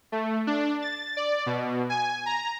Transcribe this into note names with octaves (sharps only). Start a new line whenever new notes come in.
A3
D4
A6
D5
B2
G#5
A#5